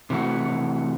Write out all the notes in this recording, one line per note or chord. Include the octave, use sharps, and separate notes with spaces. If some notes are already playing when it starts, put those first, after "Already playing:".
C3 E3 A3 F#4